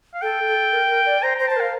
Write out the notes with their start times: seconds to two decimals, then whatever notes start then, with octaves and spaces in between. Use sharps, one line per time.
0.14 F5
0.22 A4 G5
0.47 A4
0.72 A#4
0.90 A#4
1.06 D5
1.22 C5 A#5
1.36 C5 A#5
1.48 C5 A5
1.56 A#4 F5